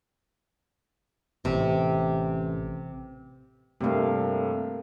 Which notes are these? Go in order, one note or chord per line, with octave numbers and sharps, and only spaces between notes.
A1 C3
G2 C3 A3 A#3 F5